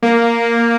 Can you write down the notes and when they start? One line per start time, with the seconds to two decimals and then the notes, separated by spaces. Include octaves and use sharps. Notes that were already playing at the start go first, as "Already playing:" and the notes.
0.03 A#3